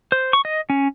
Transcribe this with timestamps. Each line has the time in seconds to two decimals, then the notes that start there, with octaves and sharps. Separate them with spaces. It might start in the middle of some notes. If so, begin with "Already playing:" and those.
0.12 C5
0.33 C#6
0.45 D#5
0.70 C#4